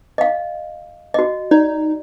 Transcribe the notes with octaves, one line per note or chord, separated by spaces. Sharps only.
D#5 F5
F#4 D#5
D#4 D5